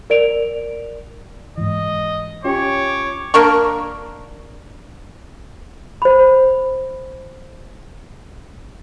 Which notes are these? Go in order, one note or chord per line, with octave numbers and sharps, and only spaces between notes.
A#4 D5 D7 F7
G#2 E3 D#5
C#4 F4 G4 C#5 D6
A#3 D4 A#4 C#6
C5 B5